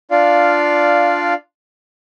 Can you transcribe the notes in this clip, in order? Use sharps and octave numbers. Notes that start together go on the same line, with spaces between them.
D4 F4 D5 F5